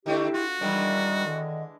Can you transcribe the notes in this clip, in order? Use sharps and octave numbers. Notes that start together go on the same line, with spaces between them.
D3 A3 C4 E4 G4
F4 F#4
D#3 E3 G3 G#3 D4 D#5
D3 D#3